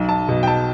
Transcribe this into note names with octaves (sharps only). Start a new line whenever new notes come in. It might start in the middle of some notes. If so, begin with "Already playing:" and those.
Already playing: B1
A5
B2
G5
A5